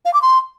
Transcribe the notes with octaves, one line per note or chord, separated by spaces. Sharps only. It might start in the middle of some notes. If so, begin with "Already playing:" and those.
F5
D6
C6